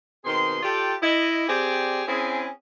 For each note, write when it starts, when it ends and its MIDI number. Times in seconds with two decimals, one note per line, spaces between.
0.25 0.58 47
0.25 0.58 51
0.25 0.58 60
0.25 0.58 68
0.25 0.58 84
0.63 0.94 65
0.63 0.94 67
0.63 0.94 69
0.63 0.94 74
0.63 0.94 79
1.02 1.46 64
1.02 1.46 75
1.47 2.02 60
1.47 2.02 67
1.47 2.02 68
1.47 2.02 74
2.07 2.47 60
2.07 2.47 61
2.07 2.47 64
2.07 2.47 68